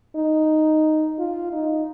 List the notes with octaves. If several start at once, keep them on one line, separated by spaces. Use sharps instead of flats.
D#4
F4
D#4